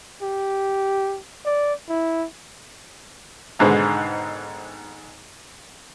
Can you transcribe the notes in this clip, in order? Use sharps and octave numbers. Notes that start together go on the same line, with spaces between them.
G4
D5
E4
G#1 G#2 B2 D3 G#3 C5